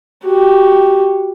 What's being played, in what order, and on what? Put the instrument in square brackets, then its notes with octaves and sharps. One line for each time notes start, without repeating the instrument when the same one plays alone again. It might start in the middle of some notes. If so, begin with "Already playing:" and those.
[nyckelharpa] F#4 G4